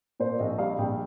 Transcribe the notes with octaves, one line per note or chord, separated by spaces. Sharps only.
A#2 C5
D5
A#1 D#5
G3 F5
A#1 G5